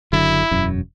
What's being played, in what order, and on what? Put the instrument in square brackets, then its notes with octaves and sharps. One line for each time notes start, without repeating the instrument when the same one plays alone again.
[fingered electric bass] F#1 D3 F#3 [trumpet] E4
[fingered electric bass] E1 F#2